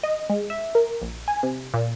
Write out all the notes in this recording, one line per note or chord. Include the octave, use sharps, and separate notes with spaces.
D#5
G#3
E5
A#4
A#1
G#5
C3
A#2